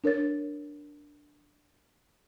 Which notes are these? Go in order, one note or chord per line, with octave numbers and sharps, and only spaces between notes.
D4 A#4 C#5 A6